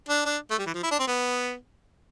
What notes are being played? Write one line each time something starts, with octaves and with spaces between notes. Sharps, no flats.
D4
D4
A3
G3
E3
F3
E4
D4
C4
B3